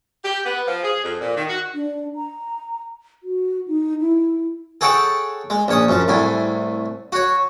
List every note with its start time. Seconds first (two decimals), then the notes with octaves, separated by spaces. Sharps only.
0.24 G4
0.45 B3
0.67 F3
0.83 G#4
1.03 F2
1.20 A#2
1.36 D#3
1.48 F#4
1.75 D4
2.15 A#5
3.23 F#4
3.68 D#4
4.01 E4
4.81 G#4 A4 C#5 F#5 G5 A5
5.50 G#3
5.68 A#1 C#5 D#6
5.88 F#2 F3
6.08 C2 A2 G#5
7.12 F#4 C#5